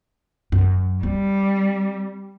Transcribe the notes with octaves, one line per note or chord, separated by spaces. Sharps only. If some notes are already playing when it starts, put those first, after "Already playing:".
F#2
G3 C4